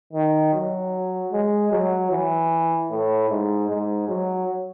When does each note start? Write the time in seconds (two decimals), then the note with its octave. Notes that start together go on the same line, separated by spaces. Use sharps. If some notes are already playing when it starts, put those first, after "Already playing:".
0.13 D#3
0.53 F#3
1.32 G#3
1.71 F#3
2.11 E3
2.90 A2
3.30 G#2
3.69 G#2
4.09 F#3